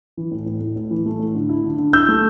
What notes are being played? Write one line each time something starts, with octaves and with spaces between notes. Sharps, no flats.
E3
A2
A2
A2
A2
E3
A3
A2
D3
E4
D3
D3
E4 E6 G6
A3